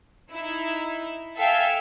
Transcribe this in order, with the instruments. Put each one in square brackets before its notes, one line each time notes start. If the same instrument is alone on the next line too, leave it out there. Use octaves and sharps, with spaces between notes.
[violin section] D#4 E4
A4 E5 F5 G5 G#5